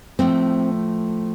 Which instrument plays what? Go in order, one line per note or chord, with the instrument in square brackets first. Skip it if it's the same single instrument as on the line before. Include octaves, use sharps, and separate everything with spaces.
[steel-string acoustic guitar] A2 F3 A3 [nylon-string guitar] C4